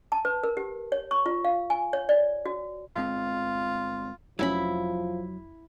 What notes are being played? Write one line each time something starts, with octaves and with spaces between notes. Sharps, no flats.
A5
B4
A#4
G4
C#5
C#6
F4
F5
G#5
C#5
D5
F#4
G1 G#3 C4 F4
F1 A2 F3 F#3 C#4 E4 B5